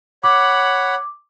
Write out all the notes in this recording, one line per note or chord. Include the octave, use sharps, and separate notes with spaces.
C#5 F#5 B5 D6